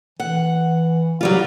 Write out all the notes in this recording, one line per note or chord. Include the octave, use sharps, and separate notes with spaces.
E3 F#5
F#3 G3 F4